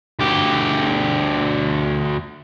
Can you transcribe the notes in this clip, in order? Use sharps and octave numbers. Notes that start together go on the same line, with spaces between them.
D2 G4